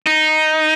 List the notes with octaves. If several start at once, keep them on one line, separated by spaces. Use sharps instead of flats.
D#4